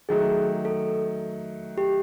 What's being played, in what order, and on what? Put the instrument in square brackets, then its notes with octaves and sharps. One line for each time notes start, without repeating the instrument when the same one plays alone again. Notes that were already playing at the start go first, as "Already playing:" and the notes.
[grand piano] D#3 F#3 A3 [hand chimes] G#4
[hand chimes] A4
G4